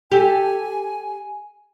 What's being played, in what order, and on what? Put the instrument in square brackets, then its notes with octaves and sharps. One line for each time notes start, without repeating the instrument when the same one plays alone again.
[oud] G4 A4 [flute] G#5